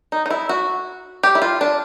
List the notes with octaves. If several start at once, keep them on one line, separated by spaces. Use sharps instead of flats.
D#4
D#4
E4
F#4
G4
E4
F4
D4